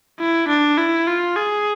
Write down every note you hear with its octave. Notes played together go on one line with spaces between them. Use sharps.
E4
D4
E4
F4
G#4